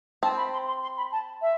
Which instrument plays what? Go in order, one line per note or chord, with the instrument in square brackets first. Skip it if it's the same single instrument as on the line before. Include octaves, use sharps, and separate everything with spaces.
[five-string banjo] C4 [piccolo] A5
[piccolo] B5
C6
C6
C6
B5
A5
E5